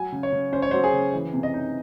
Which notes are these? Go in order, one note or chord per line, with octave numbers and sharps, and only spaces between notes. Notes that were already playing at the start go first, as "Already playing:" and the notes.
Already playing: F#3 G#5
C#3
C#5
C#3
C#4 C5
C#5
F#3 C5
G#4
C#3
E3
C3
D#5
D#4